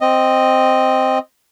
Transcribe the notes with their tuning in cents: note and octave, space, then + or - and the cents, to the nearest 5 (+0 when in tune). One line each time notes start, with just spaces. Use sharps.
C4 +0 D#5 +0